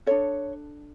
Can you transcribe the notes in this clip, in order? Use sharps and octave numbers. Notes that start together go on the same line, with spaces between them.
D4 A4 C#5